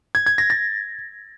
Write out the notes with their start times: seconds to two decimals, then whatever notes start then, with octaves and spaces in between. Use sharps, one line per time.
0.15 G#6
0.26 G#6
0.38 A#6
0.50 A6